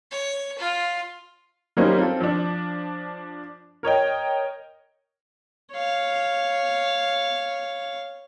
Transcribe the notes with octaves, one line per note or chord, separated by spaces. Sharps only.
C#5
F4
F#3 G3 A#3 C#4 D#4 C5
C4 F4 A4
F3 D4
A#4 C#5 D#5 G5
C#5 F5